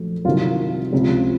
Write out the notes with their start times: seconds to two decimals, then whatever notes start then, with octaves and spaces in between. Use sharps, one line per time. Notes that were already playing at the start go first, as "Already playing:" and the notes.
Already playing: A#1 F#3 A3
0.25 C2 C3 D#3 F#3 F4
0.93 C#2 C3 F3